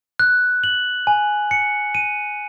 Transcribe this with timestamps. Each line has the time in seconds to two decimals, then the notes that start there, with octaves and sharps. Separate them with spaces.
0.19 F#6
0.64 F#7
1.07 G#5
1.51 C#7
1.95 D#7